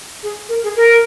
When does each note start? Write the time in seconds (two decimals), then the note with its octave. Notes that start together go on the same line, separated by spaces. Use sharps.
0.23 G#4
0.49 A#4
0.63 G#4
0.76 A#4